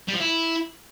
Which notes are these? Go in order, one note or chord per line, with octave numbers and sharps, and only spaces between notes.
G3
F3
E4